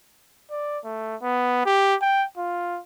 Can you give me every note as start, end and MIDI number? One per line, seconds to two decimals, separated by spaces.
0.51 0.79 74
0.84 1.16 57
1.22 1.61 59
1.66 1.95 67
2.02 2.25 79
2.37 2.80 65